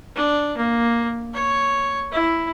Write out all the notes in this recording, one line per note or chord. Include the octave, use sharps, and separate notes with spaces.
D4
A#3
C#5
E4